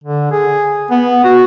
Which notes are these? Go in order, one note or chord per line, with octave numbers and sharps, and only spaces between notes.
D3
G#4
B3
F#4